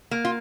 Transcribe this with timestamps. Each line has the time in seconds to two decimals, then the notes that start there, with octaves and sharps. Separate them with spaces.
0.11 A#3
0.25 F4